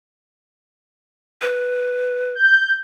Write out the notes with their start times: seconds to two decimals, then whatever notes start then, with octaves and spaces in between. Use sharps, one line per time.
1.41 B4
2.35 G6